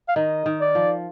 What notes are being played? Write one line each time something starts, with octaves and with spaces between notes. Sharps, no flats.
F5
D#3 D#5
D#3
D5
F3